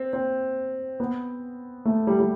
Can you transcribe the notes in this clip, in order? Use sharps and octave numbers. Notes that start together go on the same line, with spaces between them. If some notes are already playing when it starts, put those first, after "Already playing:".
Already playing: C4
C4
B3
A3
G3
G3